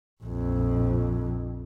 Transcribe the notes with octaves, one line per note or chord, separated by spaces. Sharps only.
A#1 F2